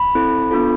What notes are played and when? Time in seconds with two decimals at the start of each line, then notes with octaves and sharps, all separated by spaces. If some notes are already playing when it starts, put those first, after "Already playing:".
Already playing: B5
0.15 C4 E4 A4
0.51 B3 D4 F4 A4